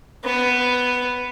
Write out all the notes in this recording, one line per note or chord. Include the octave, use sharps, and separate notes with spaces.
B3